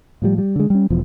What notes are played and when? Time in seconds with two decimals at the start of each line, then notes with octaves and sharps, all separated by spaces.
0.22 A2 F3 G3
0.38 G3
0.56 D3 G#3
0.70 G3 C#4
0.90 E1 E2 B2 F3